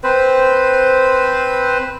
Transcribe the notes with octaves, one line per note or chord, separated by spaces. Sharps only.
C4 B4 C5